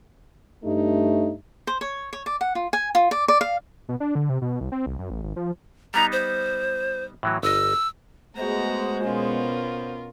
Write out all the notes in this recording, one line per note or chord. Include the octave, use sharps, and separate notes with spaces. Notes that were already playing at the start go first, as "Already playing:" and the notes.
G2 A3 D#4
C5
C#5
C#5
D5
F#5
F4
G#5
F4
D5
D5
F5
B2
D4
D3
C3
B2
C2
C4
C2
F#2
A1
G#1
F3
G3 B3 D#4 A#5
C5
A2 E3 F#3
G1 D#5 E6
G#3 A3 B3 F#4 C5 A#5
B2 B3 C#4 F4 A#4